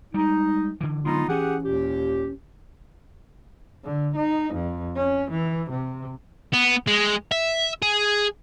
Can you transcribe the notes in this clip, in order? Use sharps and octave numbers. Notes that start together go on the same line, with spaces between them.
G3 G#3 D#4
D3 E3
D3 F#3 G#3 B3 D#4 F4
E3 C#4 G4 G#4 F#5
D#2 A#2 G4
D3
D#4
F2
C#4
E3
C3
B3
G#3
E5
G#4